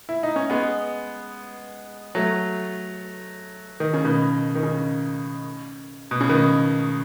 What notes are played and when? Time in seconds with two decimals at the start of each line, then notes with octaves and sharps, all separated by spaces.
0.09 E4
0.23 D#4
0.36 C#4
0.50 G#3 B3
2.15 F#3 A3
3.80 D#3
3.94 C#3
4.04 B2 D#3
4.55 D#3
4.63 C#3
6.11 B2
6.21 C#3
6.29 B2 D#3